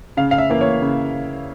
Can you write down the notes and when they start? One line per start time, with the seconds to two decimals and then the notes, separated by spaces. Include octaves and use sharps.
0.17 C#3 F5
0.31 F5
0.38 E5
0.49 E3 A#3
0.61 C#5
0.82 C#3